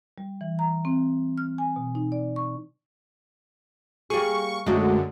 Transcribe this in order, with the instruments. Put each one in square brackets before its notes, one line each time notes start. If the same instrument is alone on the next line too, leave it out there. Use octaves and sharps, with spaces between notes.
[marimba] G3
E3
A#5
C4
F6
G#5
B2
D#4
D5
C#6
[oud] G3 A#3 G#4 [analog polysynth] C#6
[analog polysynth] F#2 D3 [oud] G#3 A3 F#4